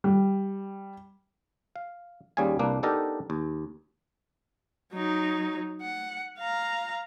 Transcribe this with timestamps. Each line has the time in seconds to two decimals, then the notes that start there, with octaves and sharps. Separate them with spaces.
0.04 G3
1.76 F5
2.37 D#2 G3 C#4 G#4 F5 G#5
2.59 C2 A#3 D4 B4
2.83 B3 D4 D#4 G4 A4 A#4
3.30 D#2
4.93 F#3 D#4
5.81 F#5
6.38 F5 A#5